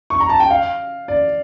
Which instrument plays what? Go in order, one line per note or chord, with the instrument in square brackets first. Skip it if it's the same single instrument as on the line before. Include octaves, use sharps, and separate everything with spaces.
[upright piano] C#6
A#5
A5
G5
F5
D5